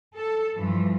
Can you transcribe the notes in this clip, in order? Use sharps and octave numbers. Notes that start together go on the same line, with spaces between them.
A4
G2 E3 F3